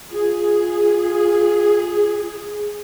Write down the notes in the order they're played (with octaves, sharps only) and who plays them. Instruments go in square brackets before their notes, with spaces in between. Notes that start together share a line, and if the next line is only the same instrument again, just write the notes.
[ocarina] F4 [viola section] G#4